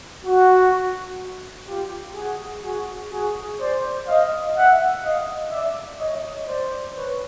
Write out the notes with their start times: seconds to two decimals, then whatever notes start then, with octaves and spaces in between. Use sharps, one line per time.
0.25 F#4
1.68 F4 G4
2.15 F#4 G#4
2.63 F#4 G#4
3.12 F#4 G#4
3.60 C5 D5
4.07 D#5 F5
4.55 E5 F#5
5.03 D#5 F5
5.50 D5 E5
5.99 C#5 D#5
6.47 C5 D5
6.95 B4 C#5